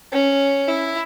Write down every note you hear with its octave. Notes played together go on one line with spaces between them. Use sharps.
C#4
E4